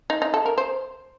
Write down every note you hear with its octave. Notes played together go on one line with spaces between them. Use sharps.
D#4
D#4
A4
A#4
C5